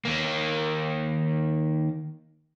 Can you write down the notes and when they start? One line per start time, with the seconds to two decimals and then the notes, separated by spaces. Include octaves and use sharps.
0.05 D#3 A#3